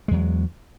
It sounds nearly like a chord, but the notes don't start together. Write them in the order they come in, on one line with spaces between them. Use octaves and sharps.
G#3 E2 F#3